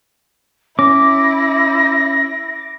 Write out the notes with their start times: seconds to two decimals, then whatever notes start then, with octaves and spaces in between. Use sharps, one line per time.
0.79 C#4 E4 D6 A#6